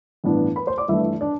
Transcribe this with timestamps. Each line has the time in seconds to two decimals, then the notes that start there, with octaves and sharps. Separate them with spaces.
0.24 A1 G2 E3 B3 D4
0.56 B4 B5
0.67 C5 C6
0.78 D5 D6
0.88 G1 G2 E3 A3 E4 E5
1.21 D4 D5